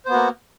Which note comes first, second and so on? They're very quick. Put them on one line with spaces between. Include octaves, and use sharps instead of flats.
C5 B3 F#4 A#3